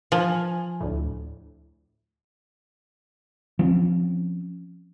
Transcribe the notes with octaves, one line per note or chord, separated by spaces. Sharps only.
F3 G#5
D2 A2
F3 C4 C#4